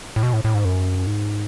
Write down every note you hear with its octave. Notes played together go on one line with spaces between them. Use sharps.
A2
B2
A2
A2
G#2
F#2
G#2